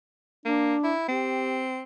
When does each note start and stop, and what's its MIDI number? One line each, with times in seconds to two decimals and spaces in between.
0.46 0.75 58
0.46 0.92 62
0.84 1.08 64
1.08 1.82 60
1.08 1.65 67